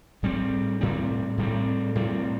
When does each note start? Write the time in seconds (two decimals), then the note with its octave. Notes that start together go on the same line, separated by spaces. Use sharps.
0.23 A2 G3 C4
0.81 A2 G3 C4
1.38 A2 G3 C4
1.95 A2 G3 C4